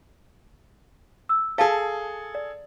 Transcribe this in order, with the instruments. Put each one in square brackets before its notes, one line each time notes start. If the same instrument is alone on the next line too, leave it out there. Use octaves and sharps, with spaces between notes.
[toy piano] E6
[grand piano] G#4 A4 [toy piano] F5 A5
[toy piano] D5